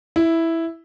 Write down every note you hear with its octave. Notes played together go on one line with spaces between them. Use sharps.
E4